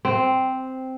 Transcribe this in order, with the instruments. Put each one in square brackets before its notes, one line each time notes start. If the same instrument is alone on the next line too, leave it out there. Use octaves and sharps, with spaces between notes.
[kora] C4